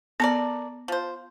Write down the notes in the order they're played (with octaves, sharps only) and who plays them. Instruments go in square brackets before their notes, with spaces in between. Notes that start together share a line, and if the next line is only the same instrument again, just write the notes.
[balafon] B3 A5 [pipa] A4 A#4 D5
[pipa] F3 C5